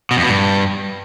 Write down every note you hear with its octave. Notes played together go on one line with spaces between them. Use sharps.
B2
F2
B2
G2